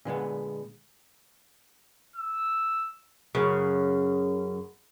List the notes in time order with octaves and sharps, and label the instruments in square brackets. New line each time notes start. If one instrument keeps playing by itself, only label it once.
[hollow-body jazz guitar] A#2 D3 G#3 B3
[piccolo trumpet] E6
[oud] F#2 C#3